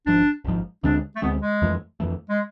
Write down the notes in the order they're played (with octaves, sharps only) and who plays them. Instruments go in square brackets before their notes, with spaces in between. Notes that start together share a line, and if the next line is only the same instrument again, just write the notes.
[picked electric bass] G#1 G#2 F3 [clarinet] D4
[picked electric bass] G#1 G#2 F3
[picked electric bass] D2 D3 G#3 C4 [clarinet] D4
[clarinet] A3
[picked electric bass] D2 D3 G#3 C4 [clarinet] B3
[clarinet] G#3
[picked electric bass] F2 E3 A3
F2 E3 A3
[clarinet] G#3